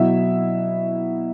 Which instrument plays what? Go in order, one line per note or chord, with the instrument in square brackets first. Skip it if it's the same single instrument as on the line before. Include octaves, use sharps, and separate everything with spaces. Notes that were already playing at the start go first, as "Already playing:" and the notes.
Already playing: [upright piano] B2 F#3 E4 E5